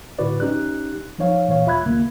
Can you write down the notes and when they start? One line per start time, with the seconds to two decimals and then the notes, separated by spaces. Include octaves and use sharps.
0.19 A2 D3 E4 F#4 B4 D5
0.40 C#4 D#4 G4 F#6
1.19 F3 D#4 C#5 F5
1.48 A#2 E3 C#5 F5
1.66 D#2 F4 E5 B5 F#6 G#6
1.86 D#2 C#3 A#3